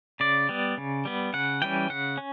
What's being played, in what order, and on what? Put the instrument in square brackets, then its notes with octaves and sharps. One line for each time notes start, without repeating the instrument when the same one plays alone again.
[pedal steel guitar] C#3 D5
G3 B3
C#3
G3 B3
C#3 F#5
E3 G3 C#4 G5
C#3 F#5
C#4